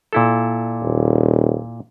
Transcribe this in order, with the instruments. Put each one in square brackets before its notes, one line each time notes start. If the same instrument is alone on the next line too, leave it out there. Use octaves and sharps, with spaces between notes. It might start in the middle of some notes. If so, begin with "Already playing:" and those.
[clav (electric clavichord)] A#2 E4 A4
[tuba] D#1